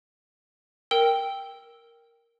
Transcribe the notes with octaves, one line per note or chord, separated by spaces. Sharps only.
A#4 G5 E6